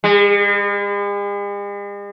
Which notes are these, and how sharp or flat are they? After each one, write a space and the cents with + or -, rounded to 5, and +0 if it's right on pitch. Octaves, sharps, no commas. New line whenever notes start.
G#3 -45